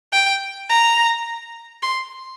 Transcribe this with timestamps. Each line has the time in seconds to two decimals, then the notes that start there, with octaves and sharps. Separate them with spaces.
0.12 G5
0.69 A#5
1.83 C6